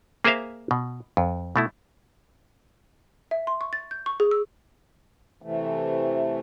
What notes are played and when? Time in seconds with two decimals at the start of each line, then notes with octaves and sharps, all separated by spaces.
0.24 A#3 G#4 A#4 C5 E5 F5
0.71 B2
1.17 F2
1.56 B2 A3 E4
3.31 E5
3.47 C6
3.61 C#6
3.73 A6
3.91 G6
4.06 C#6
4.20 G#4
4.31 E6
5.42 C3 E3 A3